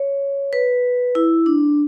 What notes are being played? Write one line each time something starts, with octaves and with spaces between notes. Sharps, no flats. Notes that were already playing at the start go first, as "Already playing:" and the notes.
Already playing: C#5
B4
E4
D4